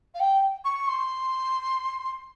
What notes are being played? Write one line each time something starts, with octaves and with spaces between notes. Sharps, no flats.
F5
G5
C#6
C6